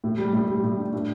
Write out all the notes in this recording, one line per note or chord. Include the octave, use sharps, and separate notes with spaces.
A2
G3
A2
G3
A2
D4
A2